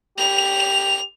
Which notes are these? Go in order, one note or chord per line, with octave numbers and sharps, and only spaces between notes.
G4 F7